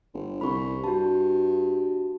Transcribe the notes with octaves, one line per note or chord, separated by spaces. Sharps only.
G1
C2 B5 C#6
G2 F#4 A5